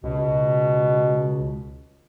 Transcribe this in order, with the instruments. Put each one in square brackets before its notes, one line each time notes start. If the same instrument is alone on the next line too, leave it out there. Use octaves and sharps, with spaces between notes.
[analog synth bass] C#2 [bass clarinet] B2